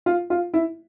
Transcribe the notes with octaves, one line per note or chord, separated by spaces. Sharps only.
F4
F4
E4